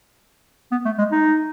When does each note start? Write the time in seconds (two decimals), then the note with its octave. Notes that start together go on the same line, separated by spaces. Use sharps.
0.72 B3
0.85 A3
0.98 G#3
1.11 D#4